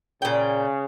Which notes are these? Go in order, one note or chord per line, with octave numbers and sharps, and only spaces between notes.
A#2 C#3 G5